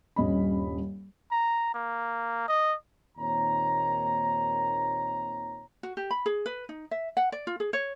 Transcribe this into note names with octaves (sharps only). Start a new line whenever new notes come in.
D#1 G2 C#4 D#5 B5
A#5
A#3
D#5
D#2 A#2 D#3 C4 C#5 A#5
F#4
G4
B5
G#4
B4
D#4
E5
F#5
D5
F4
G#4
C#5